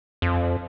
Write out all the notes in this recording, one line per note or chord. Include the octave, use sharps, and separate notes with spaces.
F2